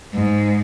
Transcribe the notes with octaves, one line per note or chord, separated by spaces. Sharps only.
G#2